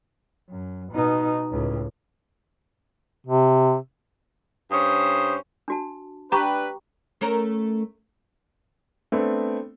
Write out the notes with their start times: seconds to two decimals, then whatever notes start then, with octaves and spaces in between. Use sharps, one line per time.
0.50 F#2
0.92 B2 D#4
1.50 C#2 A2
3.27 C3
4.71 G2 C#4 C5 D#6
5.68 D4 F#4 A5
6.32 D4 G4 B4 A#5 B5 C#6
7.21 A3 C#4 A#4
9.12 A3 B3 C4 D4